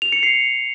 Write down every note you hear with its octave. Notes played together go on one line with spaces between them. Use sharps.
F7
C#7
C7